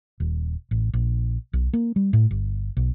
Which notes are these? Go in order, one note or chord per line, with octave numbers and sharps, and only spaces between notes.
D#1
A1
A#1
B1
A#3
G3
A2
G1
B1